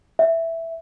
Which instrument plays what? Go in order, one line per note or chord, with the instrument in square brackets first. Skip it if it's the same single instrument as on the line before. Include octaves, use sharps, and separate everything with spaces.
[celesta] E5